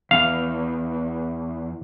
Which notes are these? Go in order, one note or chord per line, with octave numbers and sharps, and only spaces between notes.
E2 F5